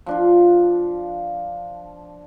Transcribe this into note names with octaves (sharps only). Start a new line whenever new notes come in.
F3 D4 F4